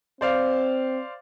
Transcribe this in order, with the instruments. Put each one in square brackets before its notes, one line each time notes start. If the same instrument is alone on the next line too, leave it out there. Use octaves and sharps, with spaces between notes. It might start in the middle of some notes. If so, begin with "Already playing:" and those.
[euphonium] C4 [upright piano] C5 D5 F5